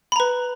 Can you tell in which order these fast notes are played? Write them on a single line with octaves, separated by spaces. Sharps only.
B5 A#5 B4